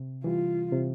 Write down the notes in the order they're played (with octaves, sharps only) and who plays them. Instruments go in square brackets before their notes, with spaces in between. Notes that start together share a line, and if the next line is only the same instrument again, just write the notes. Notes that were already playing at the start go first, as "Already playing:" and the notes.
Already playing: [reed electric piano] C3
[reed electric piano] E3 G3 [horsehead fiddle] F4
[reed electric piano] C3